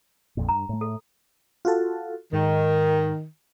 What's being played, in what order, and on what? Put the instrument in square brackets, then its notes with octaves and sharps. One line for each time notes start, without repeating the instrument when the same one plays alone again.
[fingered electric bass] A#1 F2 A#2
[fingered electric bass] G2 [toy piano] A#5
[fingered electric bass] A2 A3
[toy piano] A4
[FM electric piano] F4 F#4 A4
[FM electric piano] G#2 [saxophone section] D#3